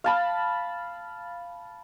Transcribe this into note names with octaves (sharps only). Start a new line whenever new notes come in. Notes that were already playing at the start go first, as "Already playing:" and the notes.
F5 A5 B5